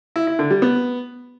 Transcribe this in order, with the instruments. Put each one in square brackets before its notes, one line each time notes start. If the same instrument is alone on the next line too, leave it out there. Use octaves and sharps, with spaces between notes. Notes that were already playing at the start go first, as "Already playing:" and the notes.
[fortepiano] E4
E4
D3
G3
B3